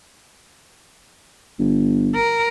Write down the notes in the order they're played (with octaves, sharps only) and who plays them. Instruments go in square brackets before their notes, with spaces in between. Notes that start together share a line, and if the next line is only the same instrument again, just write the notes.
[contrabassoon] G1
[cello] A#4